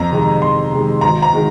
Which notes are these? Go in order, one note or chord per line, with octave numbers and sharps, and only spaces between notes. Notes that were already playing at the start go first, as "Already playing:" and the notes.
Already playing: F2 A#5
C3 D#3 G#3
F2 C6
C3 D#3 G#3
G#1 A#5
A#5
D#3 G#3